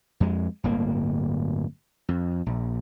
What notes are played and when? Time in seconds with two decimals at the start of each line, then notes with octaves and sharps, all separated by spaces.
0.20 F2 G#3
0.64 D1 G1 A#3
2.09 F2
2.46 A#1